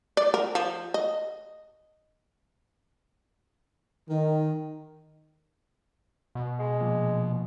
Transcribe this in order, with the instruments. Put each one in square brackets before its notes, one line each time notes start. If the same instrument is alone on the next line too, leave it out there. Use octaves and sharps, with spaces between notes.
[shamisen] D5
A#4
F3
D#5
[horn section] D#3
[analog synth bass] B2
[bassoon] G#3
[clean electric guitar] A#2 F3